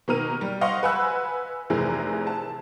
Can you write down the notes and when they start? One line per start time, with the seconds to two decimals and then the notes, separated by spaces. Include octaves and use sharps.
0.08 B2 D#3 A#3 A#5 F6 D#7
0.41 G3
0.61 C5 D#5 F5 F#5 C6 C#6
0.83 B4 F#5 G#5 B5 E6 F#6
1.70 F1 C3 E3 G#4 A#4
2.27 A5